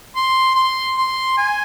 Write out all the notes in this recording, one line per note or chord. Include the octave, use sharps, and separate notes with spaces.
C6
C6
C6
G#5